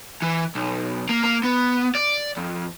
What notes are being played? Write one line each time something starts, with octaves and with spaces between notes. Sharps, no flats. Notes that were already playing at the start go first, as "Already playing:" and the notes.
E3
B1
A#3
A#3
B3
D5
F2